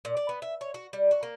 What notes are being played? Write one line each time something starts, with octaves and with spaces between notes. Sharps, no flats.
A#2
D5
B3
E5
C#5
F#4
G3
F#4
A#3